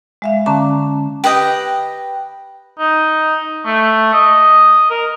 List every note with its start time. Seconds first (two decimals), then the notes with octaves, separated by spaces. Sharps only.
0.22 G#3 E5 F5
0.46 D3 C#4 A5 A#5 D6
1.24 G4 B4 D#5 G5
2.80 D#4
3.66 A3
4.14 D#5
4.90 A#4